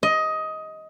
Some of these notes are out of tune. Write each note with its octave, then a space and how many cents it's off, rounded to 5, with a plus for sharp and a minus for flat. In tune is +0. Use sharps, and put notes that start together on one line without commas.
D#5 +15